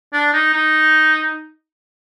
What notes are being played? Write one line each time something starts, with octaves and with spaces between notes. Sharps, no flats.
D4
D#4
D#4